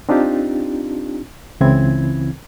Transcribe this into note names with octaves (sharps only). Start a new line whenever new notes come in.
C4 D4 D#4 F4 G4
C#2 C#3 E3 C4 E4 G#6